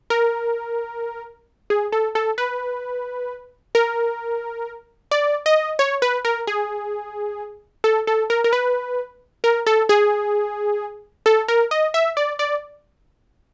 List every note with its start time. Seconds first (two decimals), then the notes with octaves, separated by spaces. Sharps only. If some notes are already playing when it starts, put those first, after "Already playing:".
0.10 A#4
1.70 G#4
1.92 A4
2.15 A4
2.38 B4
3.75 A#4
5.11 D5
5.46 D#5
5.79 C#5
6.02 B4
6.25 A#4
6.47 G#4
7.84 A4
8.07 A4
8.30 A#4
8.44 A#4
8.53 B4
9.44 A#4
9.67 A4
9.89 G#4
11.26 A4
11.48 A#4
11.71 D#5
11.94 E5
12.17 D5
12.39 D5